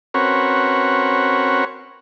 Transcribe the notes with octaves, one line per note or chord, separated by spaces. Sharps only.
C4 C#4 F#4 A#4 B4 C#5